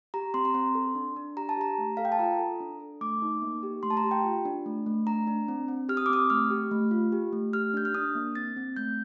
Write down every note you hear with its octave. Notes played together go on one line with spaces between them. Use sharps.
G4 A#5
C4 C6
A#5
C4 C6
A4
D4
D4
G4 A#5
A5
G4 A#5
A3
A4 F5
G5
A5
F4 A#5
A4
D4
A4
A3 D6
D#4
A#3
G4
A3 C6
A5
A#5
G4
G5
F4
D4
A3
A3
D4 A#5
D4
C4
C4
G4 F6
D#6
D6
C4 D#6
A3 F6
G4
A3
F4
G4
A3
G4 F6
D4 G6
F6
D4 D#6
A#3
C4 A6
C4
A3 G6